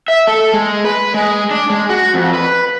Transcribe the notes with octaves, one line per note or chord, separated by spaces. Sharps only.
E5
A4
G#3
B4
G#3
D4
G#3
F#4
F2
B4